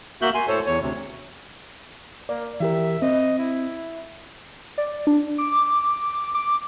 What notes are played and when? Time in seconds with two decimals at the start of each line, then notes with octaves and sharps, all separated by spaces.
0.22 A#3 F#4 E5 F#6 G6
0.34 G#5 C6
0.48 A2 A4 C5 C#5
0.67 E2 C#5
0.81 D2 C3
2.29 A#3 D5
2.60 E3 G4 A#4 E5
3.02 C4 D#5
3.39 E4
4.78 D5
5.07 D4
5.38 D6
6.35 D6